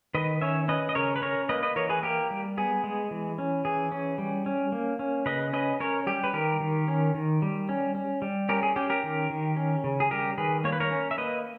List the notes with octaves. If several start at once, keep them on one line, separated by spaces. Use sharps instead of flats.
D#3 B4 D#5
C#4 C#5 E5
C#4 B4 D#5
D#5
C#3 A#4 C#5
B4
C#4 A#4 C#5
A#3 B4 D#5
B4 D#5
E3 A#4 C#5
G#4 B4
A#3 G4 A#4
G3
B3 G#4
G#3
E3
C#4
E3 G#4
C#4
G3
C#4
A#3
C#4
C#3 B4 D#5
C#4 B4 D#5
C#4 A#4 C#5
G3 G4
B4
D#3 G4 A#4
D#3
C#4
D#3
G3
C#4
C#4
G3
C#4 G4 A#4
G#4
C#4 G4
G4 A#4
D#3
D#3
C#4
C#3
G#4
G3 G4 A#4
D#3 G#4 B4
A#3 C#5
B4
A#4 C#5
C#4
E5
A#3 B4 D#5